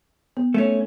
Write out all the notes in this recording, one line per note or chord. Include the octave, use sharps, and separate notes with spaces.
B3
A3 C#4